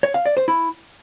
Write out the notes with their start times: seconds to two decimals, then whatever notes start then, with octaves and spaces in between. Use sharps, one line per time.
0.03 C#5
0.14 F5
0.26 D5
0.37 C5
0.48 E4